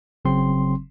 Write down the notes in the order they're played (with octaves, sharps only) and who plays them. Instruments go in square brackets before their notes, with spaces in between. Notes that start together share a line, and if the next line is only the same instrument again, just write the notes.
[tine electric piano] G1 C#3 F#3 C4 C6